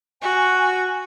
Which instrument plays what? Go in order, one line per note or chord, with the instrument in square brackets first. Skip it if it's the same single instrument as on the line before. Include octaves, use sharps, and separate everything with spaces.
[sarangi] F#4 [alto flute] G#5